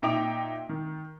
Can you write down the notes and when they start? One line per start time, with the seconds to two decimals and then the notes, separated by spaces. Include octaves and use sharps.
0.02 A#2 D#4 E5 G5 D6 F7
0.69 D#3